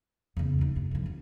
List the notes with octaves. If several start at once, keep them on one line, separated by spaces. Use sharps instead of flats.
E2 C#3
D#2 G#3
F#2 C#3
D3 F3
F#2